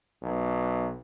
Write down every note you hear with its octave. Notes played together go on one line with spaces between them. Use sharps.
B1